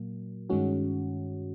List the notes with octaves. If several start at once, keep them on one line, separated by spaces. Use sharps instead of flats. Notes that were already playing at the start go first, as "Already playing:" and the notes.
Already playing: A#2 F#3 A#3
G2 D#3 G#3 C#4 F#4